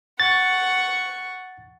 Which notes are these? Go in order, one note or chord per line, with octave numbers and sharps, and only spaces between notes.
F#5 C#6 A6